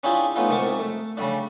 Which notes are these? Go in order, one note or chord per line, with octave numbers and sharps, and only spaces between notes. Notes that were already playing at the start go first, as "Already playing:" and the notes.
C#4 D4 E4 F4 G4 G#4
A3 B3 C#4 D#4 F4
C2 G#2 C3 A#4 C#6 D6
A3
C#3 G3 A3 D4